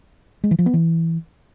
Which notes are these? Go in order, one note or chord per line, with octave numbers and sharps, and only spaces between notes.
G#3
E3
F3
B3
E3